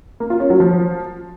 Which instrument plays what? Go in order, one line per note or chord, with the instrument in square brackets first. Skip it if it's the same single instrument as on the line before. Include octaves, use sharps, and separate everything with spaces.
[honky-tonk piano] A#3
F4
C#4
F#3
F3